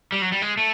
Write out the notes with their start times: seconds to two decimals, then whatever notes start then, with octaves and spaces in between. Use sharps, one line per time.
0.12 G3
0.22 F#3
0.32 G3
0.42 G#3
0.58 A3